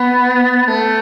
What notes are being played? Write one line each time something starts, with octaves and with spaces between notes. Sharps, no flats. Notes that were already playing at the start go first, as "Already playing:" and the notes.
Already playing: B3
A3